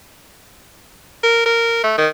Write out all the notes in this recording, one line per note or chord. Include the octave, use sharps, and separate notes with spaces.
A#4
A#4
A3
D#3